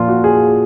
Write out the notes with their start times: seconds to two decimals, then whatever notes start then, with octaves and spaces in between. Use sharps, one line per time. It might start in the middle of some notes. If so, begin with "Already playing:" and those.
Already playing: A#2 F3 F4
0.09 F#4
0.24 G#4